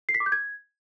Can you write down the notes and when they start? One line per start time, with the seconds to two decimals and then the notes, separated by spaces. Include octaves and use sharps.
0.09 C7
0.14 B6
0.20 D6
0.26 G6
0.32 G#6